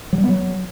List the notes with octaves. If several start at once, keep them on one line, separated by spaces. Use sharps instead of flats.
F#3
G3
B3
F#3